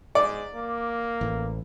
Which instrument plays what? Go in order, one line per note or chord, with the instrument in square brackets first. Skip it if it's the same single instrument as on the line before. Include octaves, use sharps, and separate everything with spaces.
[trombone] G#2 [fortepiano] D5
[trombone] A#3
[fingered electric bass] A1